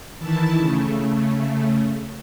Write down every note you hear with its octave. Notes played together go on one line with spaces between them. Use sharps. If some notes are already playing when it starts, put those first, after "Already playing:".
D#3 E3 E4 A5
C#3 A3